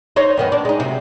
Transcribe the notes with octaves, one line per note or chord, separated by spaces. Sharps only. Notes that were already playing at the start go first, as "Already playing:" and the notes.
D#4 C5 C#5
F#2 D#3 B3
D4
G#3 D#4
C3 F#3